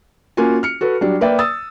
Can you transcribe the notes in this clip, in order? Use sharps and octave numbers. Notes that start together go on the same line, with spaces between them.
A#3 C#4 F4 F#4 G#5
F6 C#7
F#4 A4 B4
F#3 G3 D4
A#3 B4 D5 E5 G5
D#6 E6 A6